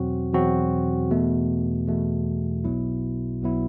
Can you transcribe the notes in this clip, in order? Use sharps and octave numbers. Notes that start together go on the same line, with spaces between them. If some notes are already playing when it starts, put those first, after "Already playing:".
Already playing: E2 B2 F#3 C4 F#4
E2 B2 F#3 C4 F#4
E2 B2 A3
E2 B2 A3
B1 B2 F#3 B3 E4
B1 B2 F#3 B3 E4